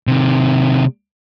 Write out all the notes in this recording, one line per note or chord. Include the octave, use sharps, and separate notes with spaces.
C3 D#3